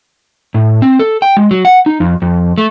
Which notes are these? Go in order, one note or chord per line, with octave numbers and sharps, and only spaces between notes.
A2
C4
A4
G5
G#3
F#3
F#5
D#4
F2
F2
A3